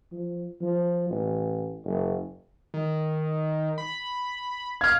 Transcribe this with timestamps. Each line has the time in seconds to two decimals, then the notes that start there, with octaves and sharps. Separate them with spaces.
0.12 F3
0.61 F3
1.10 A1
1.84 F#1
2.74 D#3
3.78 B5
4.81 F5 F6 G#6